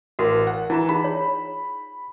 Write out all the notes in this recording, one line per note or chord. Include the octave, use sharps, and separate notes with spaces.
A1 F#4 A4 A#4
F#5
E3 E4 F4 A#5
D#4 G#4 A#5 B5
C#5